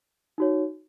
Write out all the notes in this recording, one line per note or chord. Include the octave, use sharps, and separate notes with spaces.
D#4 F#4 C#5